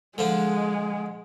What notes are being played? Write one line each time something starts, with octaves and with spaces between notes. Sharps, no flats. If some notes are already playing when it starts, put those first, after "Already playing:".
D3 F3 G#3 D4